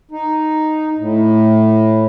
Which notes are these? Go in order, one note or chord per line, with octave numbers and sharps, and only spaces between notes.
D#4
A2